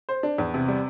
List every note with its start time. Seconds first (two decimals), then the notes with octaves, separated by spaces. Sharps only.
0.09 C5
0.23 D4
0.38 E2
0.54 C3
0.68 G3